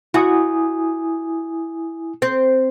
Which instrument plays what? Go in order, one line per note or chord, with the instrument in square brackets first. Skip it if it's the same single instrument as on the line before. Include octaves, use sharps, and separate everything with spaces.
[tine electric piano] E4 G#5 D#6 [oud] F#4
[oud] C4